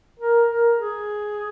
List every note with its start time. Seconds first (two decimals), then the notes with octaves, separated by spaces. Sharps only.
0.20 A#4
0.49 A#4
0.79 G#4